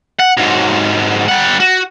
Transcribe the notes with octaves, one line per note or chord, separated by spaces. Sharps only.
F#5
G#2 F#3
G3 F#5
F#4